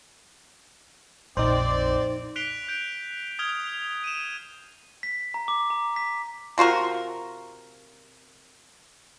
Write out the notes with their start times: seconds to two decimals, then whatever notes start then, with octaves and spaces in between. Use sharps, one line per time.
1.37 A#1 F2 C4 D#4 C5 D5
2.36 F#6 B6 C7 D7 F7 G7
2.68 G6 D7
3.39 D#6 F6 G#6 F7 G7
4.04 D#7 E7
5.03 B6
5.34 A#5
5.48 D6
5.70 A#5
5.96 B6
6.58 C3 F4 F#4 A#4